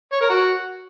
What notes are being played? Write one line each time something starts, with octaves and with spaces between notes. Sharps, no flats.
C#5
A#4
F#4